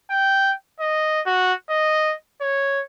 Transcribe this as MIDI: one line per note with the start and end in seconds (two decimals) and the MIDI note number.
0.11 0.53 79
0.80 1.21 75
1.26 1.53 66
1.70 2.15 75
2.41 2.82 73